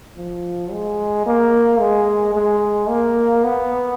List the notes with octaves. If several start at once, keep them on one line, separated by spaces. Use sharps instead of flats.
F3
G#3
A#3
G#3
G#3
A#3
B3